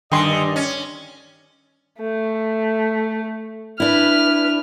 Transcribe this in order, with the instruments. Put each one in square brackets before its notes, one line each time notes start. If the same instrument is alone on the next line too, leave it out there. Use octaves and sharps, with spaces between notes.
[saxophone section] G2 D#5 [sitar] D3 [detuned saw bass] D#3 [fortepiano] G5 G#5 C6
[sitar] C#4
[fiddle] A3
[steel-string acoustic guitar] D4 E4 [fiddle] B4 F6